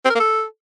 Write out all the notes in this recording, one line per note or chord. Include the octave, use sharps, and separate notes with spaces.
C4
A#4
A#3
A4